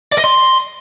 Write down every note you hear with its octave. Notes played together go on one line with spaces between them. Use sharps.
D5
D#5
C6